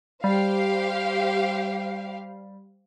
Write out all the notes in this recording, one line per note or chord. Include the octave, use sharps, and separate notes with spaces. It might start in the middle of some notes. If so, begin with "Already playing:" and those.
G3 G4 C5 F5